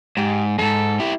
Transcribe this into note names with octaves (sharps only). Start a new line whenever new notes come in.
G#2 G4
F2 G#2 A4
E4 G4